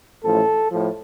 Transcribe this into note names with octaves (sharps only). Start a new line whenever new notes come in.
A1 A2 F3 A4
A2 F3